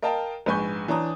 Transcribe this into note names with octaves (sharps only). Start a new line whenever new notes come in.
A#4 D#5 F5 G5 A5
A#1 G#2 B4 G#5 C#6 G6
E3 D4 C#5 A5 A#5 D#6